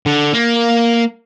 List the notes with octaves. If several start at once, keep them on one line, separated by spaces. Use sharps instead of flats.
D3
A#3